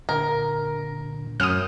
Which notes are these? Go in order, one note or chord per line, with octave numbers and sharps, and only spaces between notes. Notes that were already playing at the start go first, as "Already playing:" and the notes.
A#2 D3 A#4
F#2 D#6 F6